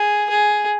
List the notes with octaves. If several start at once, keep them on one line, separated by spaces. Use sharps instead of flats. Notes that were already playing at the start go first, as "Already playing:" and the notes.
Already playing: G#4
G#4